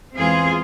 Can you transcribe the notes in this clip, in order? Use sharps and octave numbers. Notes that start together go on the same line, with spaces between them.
E2 E3 G#3 C4 F4 G#4